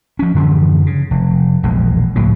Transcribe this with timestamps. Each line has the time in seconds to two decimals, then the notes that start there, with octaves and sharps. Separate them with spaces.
0.19 F3 C#4
0.34 F#2 D3 E3 F3
0.86 C#3
1.11 F1
1.63 E1 A#1 B2 G#3
2.16 C#2 A2 F3 F#3